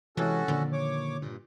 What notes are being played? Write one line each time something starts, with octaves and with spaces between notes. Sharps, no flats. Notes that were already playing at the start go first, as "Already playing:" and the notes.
C3 E3 G#3 C#4 F#4 A4
A#2 D3 D#3 F3
C#5 D6
G2 A#2